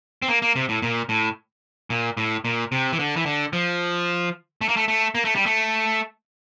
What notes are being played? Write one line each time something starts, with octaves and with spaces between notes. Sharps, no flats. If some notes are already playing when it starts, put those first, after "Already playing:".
C4
A#3
A#3
C3
A2
A#2
A2
A#2
A2
A#2
C3
E3
D3
E3
D3
F3
A3
A#3
A3
A3
A#3
A3
G3
A3